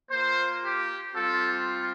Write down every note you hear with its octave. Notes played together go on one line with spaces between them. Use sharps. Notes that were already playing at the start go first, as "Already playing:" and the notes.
A#3 F4 C5
G4
G3 C4 F4 A4